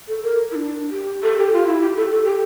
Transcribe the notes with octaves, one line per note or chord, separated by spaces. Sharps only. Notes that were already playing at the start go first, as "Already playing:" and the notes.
A4
A#4
E4
D4
G4
A4
G4
F4
E4
G4
A4
A4
G4